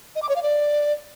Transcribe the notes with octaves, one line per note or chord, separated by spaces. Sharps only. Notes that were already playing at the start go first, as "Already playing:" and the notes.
D#5
D6
C#5
F5
D5